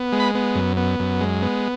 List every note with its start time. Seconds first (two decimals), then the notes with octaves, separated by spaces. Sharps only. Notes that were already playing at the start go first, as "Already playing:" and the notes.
Already playing: B3
0.12 G#3
0.20 B5
0.35 B3
0.55 F#2
0.77 B3
1.00 F#2
1.20 G#3
1.42 B3